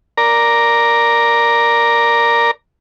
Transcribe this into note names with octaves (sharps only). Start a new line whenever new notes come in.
A#4 D5 A#5